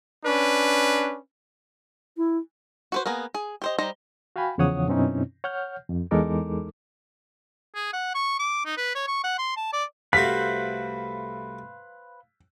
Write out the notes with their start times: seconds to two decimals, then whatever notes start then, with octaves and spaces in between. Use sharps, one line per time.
0.25 C#4 D4 B4
2.17 E4
2.92 F#4 B4 C5
3.06 A#3 B3 G#4 A#4
3.34 G#4
3.62 G4 C5 D#5
3.79 G3 D#4 C5 A#5
4.36 F#4 F5 G5 G#5 B5
4.58 E2 C#3 F3 C#5 F#5 D#6
4.88 F#2 B2 C4 C#4 D#4 E4
5.44 C#5 F#5 F6 G6
5.89 F2
6.11 E2 G#3 D#4 A4 A#4 D6
7.75 G#4
7.93 F#5
8.14 C#6
8.39 D6
8.65 D#4
8.77 B4
8.95 C#5
9.07 C#6
9.24 F#5
9.38 C6
9.57 A5
9.73 D5
10.13 C2 A3 F#4 B4 C5 F5 B6